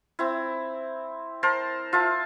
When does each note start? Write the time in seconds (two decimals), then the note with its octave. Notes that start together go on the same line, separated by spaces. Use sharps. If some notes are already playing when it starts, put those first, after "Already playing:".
0.19 C4 E4
1.43 A#4 C5 A5
1.93 F4 E5 A5